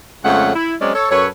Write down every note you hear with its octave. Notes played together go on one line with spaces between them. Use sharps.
F2 C#3 G#3 A3 C#4 F#5
E4
F#3 G#3 C4 C#4 D5
A4 C#5
F#2 A4 B4 C#5